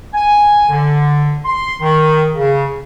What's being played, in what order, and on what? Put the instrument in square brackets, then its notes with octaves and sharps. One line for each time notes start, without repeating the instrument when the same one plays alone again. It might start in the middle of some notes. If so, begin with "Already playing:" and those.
[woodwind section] G#5
D3
C6
D#3
C#3